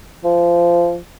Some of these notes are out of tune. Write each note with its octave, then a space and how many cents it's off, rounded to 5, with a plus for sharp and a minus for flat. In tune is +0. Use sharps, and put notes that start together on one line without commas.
F3 -20